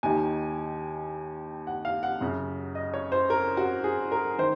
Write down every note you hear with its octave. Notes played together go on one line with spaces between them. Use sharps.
D#2 D#3 G#5
F#5
F5
F#5
F#2 C#3
D#5
C#5
C5
A#4
F#4
G#4
A#4
D#3 C5